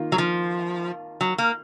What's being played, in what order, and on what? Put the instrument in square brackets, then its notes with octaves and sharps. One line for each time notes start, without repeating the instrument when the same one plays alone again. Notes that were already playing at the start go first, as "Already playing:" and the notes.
Already playing: [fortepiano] D#3 A#3 F4
[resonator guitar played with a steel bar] F#3
F3
F#3
A#3